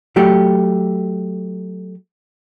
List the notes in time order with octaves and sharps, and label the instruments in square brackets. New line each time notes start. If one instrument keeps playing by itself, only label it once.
[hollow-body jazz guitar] F#3 A3 G4